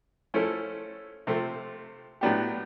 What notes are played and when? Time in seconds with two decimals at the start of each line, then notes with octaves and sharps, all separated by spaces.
0.34 F3 A3 C#4 E4 A4
1.27 C3 F3 A3
2.21 A2 F#3 B3 D4 G4